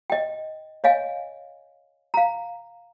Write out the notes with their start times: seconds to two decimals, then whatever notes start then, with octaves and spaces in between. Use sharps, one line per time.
0.10 D#5 G5
0.84 C#5 D#5 F5 G#5
2.14 F5 A#5